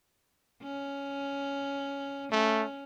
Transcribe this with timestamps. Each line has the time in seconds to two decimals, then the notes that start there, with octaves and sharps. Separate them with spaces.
0.63 C#4
2.32 A3 C#4